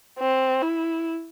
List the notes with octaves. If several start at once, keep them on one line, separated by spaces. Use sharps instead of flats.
C4
E4